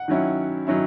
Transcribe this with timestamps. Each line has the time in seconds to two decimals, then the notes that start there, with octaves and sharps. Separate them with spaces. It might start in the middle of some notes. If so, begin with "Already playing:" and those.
Already playing: F#5
0.08 D#3 F#3 C#4 E4
0.67 D#3 F#3 C#4 E4